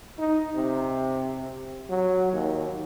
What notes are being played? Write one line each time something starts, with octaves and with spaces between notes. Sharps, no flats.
D#4
C3
F#3
D#2